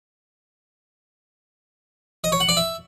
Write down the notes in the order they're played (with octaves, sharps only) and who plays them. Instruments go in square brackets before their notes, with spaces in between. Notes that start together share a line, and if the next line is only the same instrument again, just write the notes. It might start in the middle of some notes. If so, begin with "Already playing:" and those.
[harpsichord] D#5
C#5
F#5
D5
E5